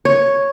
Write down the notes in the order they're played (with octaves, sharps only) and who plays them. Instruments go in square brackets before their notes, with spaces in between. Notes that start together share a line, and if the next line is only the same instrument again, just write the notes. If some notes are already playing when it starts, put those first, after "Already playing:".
[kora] C#5